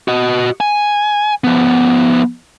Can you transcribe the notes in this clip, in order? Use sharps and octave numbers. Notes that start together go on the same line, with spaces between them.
F#4 D#5
G#5
F3 B3